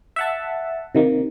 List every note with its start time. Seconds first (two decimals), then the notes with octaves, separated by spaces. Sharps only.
0.16 E5 F#5 A5
0.95 C3 D#3 A#3